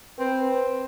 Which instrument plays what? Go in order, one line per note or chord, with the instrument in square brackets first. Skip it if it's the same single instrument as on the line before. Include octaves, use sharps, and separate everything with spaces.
[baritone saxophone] C4 [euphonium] B4